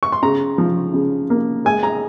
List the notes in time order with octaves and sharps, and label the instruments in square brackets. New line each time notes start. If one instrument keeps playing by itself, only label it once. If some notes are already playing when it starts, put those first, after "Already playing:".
[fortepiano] C#6
C6
C#3 A#5
F3
C#3
A#3
G#3 G#5
A#5